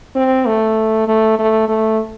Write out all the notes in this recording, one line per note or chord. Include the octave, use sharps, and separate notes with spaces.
C4
A3
A3
A3
A3